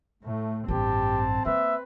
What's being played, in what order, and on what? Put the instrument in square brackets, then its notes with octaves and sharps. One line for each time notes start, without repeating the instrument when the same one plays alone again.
[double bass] A2 [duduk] A3
[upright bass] A1 G2 [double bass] C4 [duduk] G4 [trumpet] A5
[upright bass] A#3 [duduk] B4 [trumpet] E5